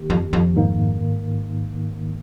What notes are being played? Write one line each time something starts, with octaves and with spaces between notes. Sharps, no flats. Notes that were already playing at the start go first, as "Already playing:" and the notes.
Already playing: D#3 A#3 G4
F2
F2
G#2 D#3 A#3